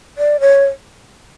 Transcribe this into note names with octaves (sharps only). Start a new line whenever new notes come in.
D5
C#5